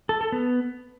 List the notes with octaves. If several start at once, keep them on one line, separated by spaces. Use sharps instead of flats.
A4
A4
B3